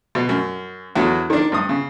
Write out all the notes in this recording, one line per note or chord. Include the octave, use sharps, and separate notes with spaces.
B2
F#2
E2 D3 F#3
D#3 D4
G2 D#6
C#3